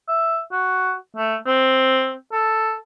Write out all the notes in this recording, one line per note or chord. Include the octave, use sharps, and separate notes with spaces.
E5
F#4
A3
C4
A4